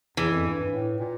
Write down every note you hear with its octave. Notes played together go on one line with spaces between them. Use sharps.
E2 E3
F2
G2
G2
A2
A#2